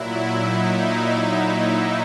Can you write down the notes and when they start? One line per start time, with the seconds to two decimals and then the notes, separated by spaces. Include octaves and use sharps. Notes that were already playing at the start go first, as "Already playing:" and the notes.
Already playing: A#2 F#3 E4
0.20 D#4